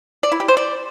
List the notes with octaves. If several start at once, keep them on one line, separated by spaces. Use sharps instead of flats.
D5
E4
G4
C5
D5